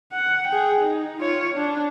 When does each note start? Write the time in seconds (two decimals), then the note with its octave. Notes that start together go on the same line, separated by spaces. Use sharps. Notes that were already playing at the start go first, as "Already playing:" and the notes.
0.13 F#5
0.47 G#4 G5
0.81 D#4
1.21 F4 C#5
1.55 D4